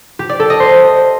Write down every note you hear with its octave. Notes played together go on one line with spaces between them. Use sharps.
G4
D5
A4
D#5
C5